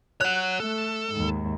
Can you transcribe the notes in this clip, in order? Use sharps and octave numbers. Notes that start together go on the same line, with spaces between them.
C#5 F#5 F#6
A3 A4
D#2 G#2